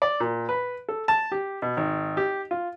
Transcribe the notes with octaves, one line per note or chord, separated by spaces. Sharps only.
D5
A#2
B4
A4
A5
G4
B2
G#1
G4
F4